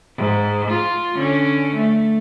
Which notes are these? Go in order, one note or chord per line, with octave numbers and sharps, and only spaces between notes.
G#2
F4
D3 C#4
A3